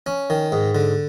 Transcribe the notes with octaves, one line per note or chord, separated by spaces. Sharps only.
C#4
D#3
G#2
D3